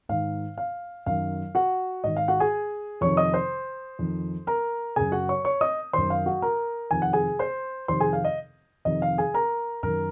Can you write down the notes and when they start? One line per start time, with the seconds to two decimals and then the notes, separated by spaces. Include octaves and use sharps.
0.09 G#2 D#3 F5
0.58 F5
1.06 F#2 D#3 F5
1.55 F#4 F#5
2.04 G#2 D#3 D#5
2.16 F5
2.28 F#4 F#5
2.40 G#4 G#5
3.01 F2 C3 D#3 C#5 C#6
3.17 D#5 D#6
3.34 C5 C6
3.99 F2 D#3
4.47 A#4 A#5
4.96 F#2 C#3 G#4 G#5
5.12 F#4 F#5
5.29 C#5 C#6
5.45 C#5 C#6
5.61 D#5 D#6
5.93 F#2 D#3 C5 C6
6.10 F5
6.26 F#4 F#5
6.42 A#4 A#5
6.91 F2 C3 D#3 G#5
7.02 F#5
7.13 G#4 G#5
7.39 C5 C6
7.88 F2 C3 D#3 C5 C6
8.00 G#4 G#5
8.13 F5
8.25 D#5
8.85 F2 C3 D#3 D#5
9.02 F5
9.18 G#4 G#5
9.34 A#4 A#5
9.83 F#2 D#3 A#4 A#5